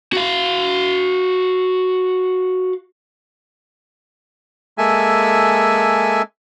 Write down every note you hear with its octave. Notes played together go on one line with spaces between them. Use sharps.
F#4 F5
G#3 A#3 A4 E5 G#5